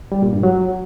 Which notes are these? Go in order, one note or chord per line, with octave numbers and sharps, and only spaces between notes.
G3
A#2
G2
F#3